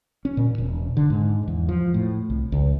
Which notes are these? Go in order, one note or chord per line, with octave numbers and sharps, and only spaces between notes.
C#4
A#2
E1
D3
G#2
E2
F3
A2
C2
C#2